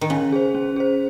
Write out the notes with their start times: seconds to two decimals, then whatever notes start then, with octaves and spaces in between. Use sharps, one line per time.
0.01 D#3
0.10 C#3 C#4
0.32 G#4 C5
0.55 C#4
0.76 G#4 C5